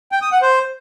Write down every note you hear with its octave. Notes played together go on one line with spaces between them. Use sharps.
G5
D#6
F#5
C5